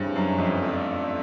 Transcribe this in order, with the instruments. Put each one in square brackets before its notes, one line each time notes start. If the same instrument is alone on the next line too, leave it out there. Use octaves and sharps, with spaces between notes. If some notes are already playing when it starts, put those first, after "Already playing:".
Already playing: [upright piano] G2 [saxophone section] C#3 E3 G3 C4
[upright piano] F#2
F2
[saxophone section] A3 D4 F4 A4 D5